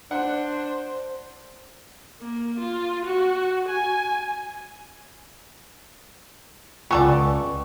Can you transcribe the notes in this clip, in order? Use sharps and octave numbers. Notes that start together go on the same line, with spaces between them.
D4 C5 F#5
A#3
F4
F#4
G#5
C#2 B3 F4 A4 D5 G5 G#5 C#6